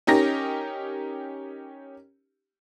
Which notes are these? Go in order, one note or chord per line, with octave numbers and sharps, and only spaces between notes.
C#4 D#4 G4 A#4 A#6